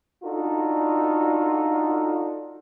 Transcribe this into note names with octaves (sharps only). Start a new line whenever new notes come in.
D4 D#4 F4 F#4 A4